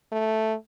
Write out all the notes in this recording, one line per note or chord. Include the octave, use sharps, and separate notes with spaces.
A3